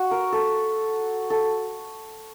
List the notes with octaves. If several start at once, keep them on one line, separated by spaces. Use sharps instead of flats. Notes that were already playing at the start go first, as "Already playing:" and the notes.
Already playing: F#4
A#4
A4
A4